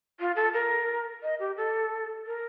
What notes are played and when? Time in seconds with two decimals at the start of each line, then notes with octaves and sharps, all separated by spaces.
0.19 F4
0.36 A4
0.53 A#4
1.23 D#5
1.39 G4
1.57 A4
2.26 A#4